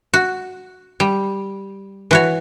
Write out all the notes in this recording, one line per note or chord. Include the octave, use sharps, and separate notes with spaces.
F#4
G3
E3 F#4 C#5